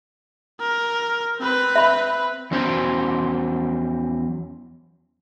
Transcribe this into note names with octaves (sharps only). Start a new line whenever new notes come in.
A#4
C4 B4
E5 B5
E2 F#3 C#4 C5